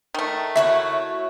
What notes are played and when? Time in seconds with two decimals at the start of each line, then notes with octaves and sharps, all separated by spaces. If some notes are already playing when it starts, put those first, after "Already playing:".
0.14 D#3 A3
0.56 E4 F#4 C#5 E5